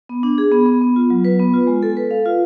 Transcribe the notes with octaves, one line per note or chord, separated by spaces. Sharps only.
B3
D4
G#4
B3
B3
B3
F4
F#3
B4
B3
F4
G#3
A4
B4
F5
F4